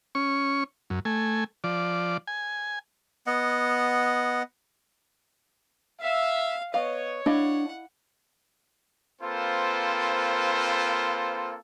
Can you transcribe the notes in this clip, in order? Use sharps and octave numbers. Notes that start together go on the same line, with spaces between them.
C#4 C#6
F#2
A3 G#5
F3 D5
G#5
B3 D#5 F#5
E5 F5
B3 C#5 D#5 F5
D4 E4 D#5 F5 F#5
A#3 C4 F4 A4 B4 C5